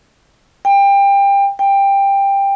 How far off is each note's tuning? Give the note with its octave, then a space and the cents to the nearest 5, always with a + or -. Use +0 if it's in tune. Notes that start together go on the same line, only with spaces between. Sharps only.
G5 +25
G5 +15